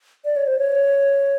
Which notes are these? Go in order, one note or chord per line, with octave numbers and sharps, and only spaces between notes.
D5
C#5
C5
C#5